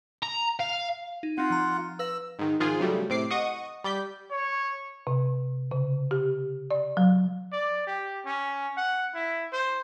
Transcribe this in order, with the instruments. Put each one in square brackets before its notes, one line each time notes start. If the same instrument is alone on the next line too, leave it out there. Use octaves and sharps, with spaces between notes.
[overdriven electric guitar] A#5
F5
[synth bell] D#4
[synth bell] C4 D#4 [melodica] F4 F#5
[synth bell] F3 A#5
[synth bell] B4 F5 A#6 [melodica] E6
[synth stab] G#2 D#3
G#2 D#3 F3 F4 G#4
C#3 F#3 G3 A3
A2 C3 D6 C7
D#5 F#5 C#6 D#6
G3 D5 G6 B6
[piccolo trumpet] C#5
[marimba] C3
C#3
G4
D5
F#3
[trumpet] D5
G4
C#4
F#5
E4
C5